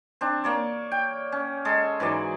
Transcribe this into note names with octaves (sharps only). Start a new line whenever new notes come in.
C4 D4
A#3 C#5 D5
G5
C#4
G#3 G#4 A4
G#2 E3 F#3 D5